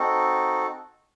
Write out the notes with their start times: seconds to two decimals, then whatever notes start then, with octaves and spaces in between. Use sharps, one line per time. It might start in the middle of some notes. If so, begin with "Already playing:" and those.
Already playing: C4 D#4 F#4 A4